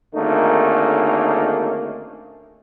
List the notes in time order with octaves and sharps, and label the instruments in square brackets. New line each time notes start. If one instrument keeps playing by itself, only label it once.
[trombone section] G#1 D3 A3 A#3 C#4 D#4